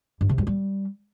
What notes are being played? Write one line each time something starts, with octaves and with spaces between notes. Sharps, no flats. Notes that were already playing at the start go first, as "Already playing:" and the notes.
G2
C3
G2
G3